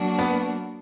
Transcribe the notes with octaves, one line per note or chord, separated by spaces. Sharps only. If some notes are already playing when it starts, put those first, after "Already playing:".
Already playing: F#3 A#3 D4 F#4
B3